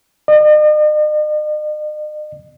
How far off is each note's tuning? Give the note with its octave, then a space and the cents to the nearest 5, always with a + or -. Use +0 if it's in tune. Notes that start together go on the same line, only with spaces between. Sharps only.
D#5 -45